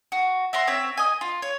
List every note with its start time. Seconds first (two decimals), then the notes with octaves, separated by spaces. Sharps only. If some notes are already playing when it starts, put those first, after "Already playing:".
0.12 F#4
0.53 E5 F#5 A#5 C6
0.67 C4 C#5 E5
0.97 D#5 G#5
1.21 F4
1.42 C#5